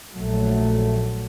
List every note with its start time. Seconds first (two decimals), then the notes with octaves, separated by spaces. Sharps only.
0.15 A#1 F#3 A3